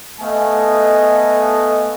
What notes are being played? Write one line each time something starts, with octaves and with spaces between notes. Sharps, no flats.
A3 B3 A4 D#5 F5 G#5